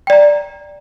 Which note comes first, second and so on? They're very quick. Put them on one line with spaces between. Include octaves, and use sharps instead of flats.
G5 D5 A#5